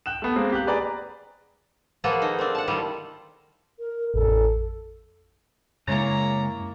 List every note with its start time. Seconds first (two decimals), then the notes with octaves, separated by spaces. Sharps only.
0.06 G5 F#6 E7
0.22 A3 B3
0.36 G#3 A#3 C4
0.52 G4 F#6
0.67 G#4 B4 D5 A#5
2.04 F3 A#3 B3 F4 G#4 A4
2.22 D#3 D#4
2.39 C4 D4
2.55 F#5 A5
2.67 D#3 G3 A3 E4 F4
3.79 A#4
4.14 A1 F2 A4
5.88 F#2 C#3 G#3 A#3 E4 C#5 A#5 A6